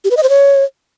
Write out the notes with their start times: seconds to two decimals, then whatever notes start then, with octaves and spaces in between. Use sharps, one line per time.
0.04 G4
0.11 B4
0.17 D#5
0.23 C5
0.29 C#5